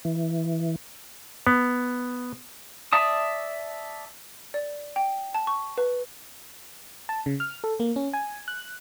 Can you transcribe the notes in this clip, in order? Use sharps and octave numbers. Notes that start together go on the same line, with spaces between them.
E3
B3
D5 E5 A5 D#6
D5
G5
A5
C#6
B4
A5
C#3
F6
A4
A#3
C#4
G#5
F#6